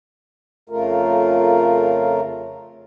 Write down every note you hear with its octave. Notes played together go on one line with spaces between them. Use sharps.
F2 C#3 A3 F4 A#4